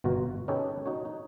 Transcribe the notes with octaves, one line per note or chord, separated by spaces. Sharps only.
G1 B2 F4 F#4 A#5
C#4 D#4 G4 A4 B4 C#5
D#4 F#4 C#5
D#4